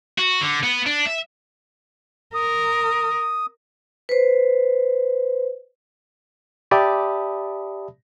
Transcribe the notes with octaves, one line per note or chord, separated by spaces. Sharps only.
F#4
D3
B3
D4
E5
A#4 D#6
B4 C5
G4 D5 E5 A5 B5 D#6